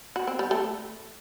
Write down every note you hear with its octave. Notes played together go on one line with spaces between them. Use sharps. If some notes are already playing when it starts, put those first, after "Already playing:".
F#4
C4
G3
A3